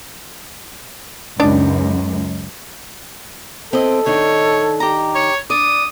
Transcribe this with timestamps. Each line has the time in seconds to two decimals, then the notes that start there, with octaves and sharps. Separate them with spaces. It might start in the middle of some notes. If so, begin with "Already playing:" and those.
1.40 C#2 F#2 D4 D#4 D5
3.73 C4 E4 A4 D#5
4.06 D#3 D4 D#4 C#5
4.48 A5
4.80 G4 A#5
5.15 C#5
5.50 D4 D5 D#6